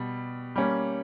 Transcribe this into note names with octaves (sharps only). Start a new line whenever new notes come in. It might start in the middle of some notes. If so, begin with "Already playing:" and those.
Already playing: B2 G3
G3 A#3 C#4